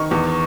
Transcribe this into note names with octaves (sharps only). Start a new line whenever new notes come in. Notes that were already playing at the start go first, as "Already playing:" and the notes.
Already playing: D#3 C#6
E2